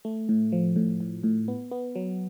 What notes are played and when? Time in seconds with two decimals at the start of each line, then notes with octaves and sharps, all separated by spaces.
0.05 A3
0.29 A2
0.52 F3
0.76 A2
1.00 A2
1.24 A2
1.48 B3
1.71 B3
1.95 F#3